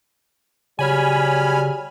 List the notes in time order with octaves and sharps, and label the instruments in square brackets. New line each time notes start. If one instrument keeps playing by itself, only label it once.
[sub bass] C#3 [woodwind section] F#3 G3 [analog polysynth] G#5 B5 F6